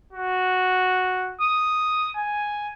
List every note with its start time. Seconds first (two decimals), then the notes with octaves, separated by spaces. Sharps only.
0.13 F#4
1.41 D#6
2.17 G#5